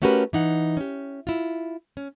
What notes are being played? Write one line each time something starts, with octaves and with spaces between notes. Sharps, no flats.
A3 C#4 F#4 G4 A#4 B4
E3 D#4 F#5
C#4 G4
E4 F4
C#4